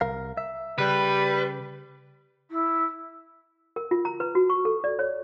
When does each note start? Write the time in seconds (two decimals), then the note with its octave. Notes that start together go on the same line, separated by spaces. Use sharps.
0.01 C2 A#4 F5
0.37 E5
0.78 C#3 G3 B4
2.51 E4
3.76 A#4
3.91 F4
4.05 A#5
4.20 B4
4.35 F#4
4.50 C#6
4.65 A4
4.84 D5
4.99 C#5